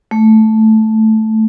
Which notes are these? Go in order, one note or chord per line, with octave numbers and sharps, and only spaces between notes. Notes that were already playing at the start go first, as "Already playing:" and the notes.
A3